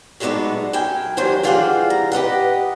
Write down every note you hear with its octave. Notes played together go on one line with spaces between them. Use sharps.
F#3 G#3 A3 B3 D4 D#4
F#2 G5 G#5
D#2 D#3 F#3 G3 C5 F#5
E3 G3 F4 G#4 F5 F#5
A#5
G4 B4 D#5 F#5